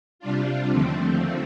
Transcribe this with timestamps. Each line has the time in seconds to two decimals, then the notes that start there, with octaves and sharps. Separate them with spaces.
0.19 C3 G3 D4 F4
0.69 D#2 D3 F3 A3 C4